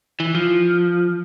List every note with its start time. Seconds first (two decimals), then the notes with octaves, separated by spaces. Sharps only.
0.20 E3
0.35 F3